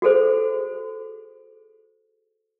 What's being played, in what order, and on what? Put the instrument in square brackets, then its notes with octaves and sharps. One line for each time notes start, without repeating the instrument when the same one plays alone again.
[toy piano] F#4 G#4 A4 C5